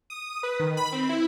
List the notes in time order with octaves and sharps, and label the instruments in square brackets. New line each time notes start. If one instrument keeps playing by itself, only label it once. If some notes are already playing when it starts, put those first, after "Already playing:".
[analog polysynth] D#6
B4
D#3
B5
C4
E4